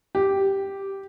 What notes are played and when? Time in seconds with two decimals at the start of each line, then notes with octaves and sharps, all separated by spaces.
0.15 G4